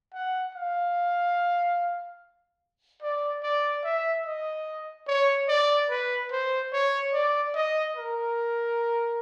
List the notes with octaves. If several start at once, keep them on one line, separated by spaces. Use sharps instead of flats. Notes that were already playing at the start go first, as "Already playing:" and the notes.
F#5
F5
D5
D5
E5
D#5
C#5
D5
B4
C5
C#5
D5
D#5
A#4